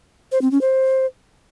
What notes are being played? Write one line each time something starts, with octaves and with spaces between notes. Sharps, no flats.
C5
C4
C#4
C5